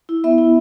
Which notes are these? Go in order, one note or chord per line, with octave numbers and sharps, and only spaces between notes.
E4
B3 E5
E4